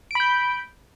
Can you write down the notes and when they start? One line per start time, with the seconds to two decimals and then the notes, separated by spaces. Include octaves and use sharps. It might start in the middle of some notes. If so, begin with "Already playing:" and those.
0.11 D7
0.15 B5
0.20 G6